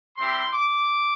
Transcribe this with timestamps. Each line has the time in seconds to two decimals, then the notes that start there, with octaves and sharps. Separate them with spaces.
0.17 G3 C4 E4 G4 C6
0.53 D6